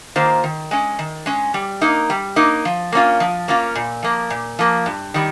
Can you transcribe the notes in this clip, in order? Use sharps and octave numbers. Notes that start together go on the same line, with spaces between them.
D#3 A#3 F4 C5
D#3
G#3 C#4
D#3
G#3 C#4
G3
A#3 D#4
G3
A#3 D#4
F3
A#3 C#4 F4
F3
A#3 C#4 F4
A#2
F3 A#3
A#2
F3 A#3
G2
D#3 G3